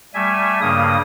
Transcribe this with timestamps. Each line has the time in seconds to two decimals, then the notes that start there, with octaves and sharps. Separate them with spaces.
0.14 G3 A3 E5 G#5
0.62 G2 C#3 A#3 D#6